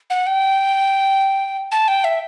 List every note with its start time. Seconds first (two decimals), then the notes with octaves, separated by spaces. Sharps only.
0.10 F#5
0.27 G5
1.72 A5
1.88 G5
2.04 E5